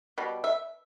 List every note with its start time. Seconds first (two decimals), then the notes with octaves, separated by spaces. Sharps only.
0.18 B2 G3
0.44 E5